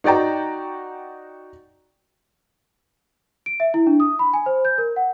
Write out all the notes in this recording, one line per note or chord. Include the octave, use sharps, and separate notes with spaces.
D#4 F#4 D5 G5 A#5
D7
E5
E4
D4
D#6
B5
G#5
C5
G6
A#4
F#5